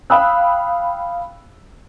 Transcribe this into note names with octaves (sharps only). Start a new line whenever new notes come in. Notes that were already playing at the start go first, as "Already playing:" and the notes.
F5 G5 B5 D#6 E6 F#6